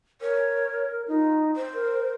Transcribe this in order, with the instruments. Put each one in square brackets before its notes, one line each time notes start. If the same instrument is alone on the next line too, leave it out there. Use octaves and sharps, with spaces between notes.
[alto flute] A#4 [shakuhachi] C#5
[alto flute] D#4 [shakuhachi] F4
[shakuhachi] C5
[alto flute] A#4